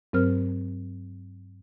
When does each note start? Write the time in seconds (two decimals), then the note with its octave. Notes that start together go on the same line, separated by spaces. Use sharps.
0.13 G2 F#3 C4 A#4 C5 F6